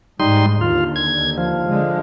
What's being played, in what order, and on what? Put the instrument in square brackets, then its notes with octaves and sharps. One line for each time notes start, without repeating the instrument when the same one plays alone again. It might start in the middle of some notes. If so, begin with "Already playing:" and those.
[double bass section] G#2 [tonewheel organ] G3 D#4 C6
[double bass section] D#2 D3 [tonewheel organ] F4
[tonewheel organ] G#6
F3
[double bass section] D3 G#3